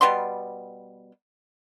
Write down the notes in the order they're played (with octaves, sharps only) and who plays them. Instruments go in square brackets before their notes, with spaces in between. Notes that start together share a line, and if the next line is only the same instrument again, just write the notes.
[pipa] B2 G3 B3 C6